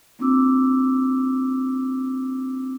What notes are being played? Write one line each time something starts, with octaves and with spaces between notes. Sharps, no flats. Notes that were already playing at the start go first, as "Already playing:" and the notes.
A#3 C4 D4 F4 D6 E6